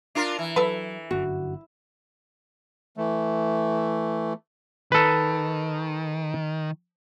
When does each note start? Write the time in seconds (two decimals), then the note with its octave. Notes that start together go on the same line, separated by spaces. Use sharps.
0.15 D4 F4 A#4
0.39 E3
0.56 F#3 A4 B4
1.11 G1 F#2 D3 F#4
2.97 E3 A3
4.92 D#3 A4 B4